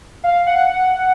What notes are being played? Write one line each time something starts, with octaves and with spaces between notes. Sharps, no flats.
F5
F#5